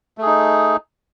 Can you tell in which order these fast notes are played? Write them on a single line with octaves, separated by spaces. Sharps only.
A3 G#4 D#4